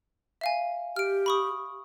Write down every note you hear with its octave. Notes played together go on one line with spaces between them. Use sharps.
E5 F5 G#5
G4 F6 D7
B5 C#6 D#6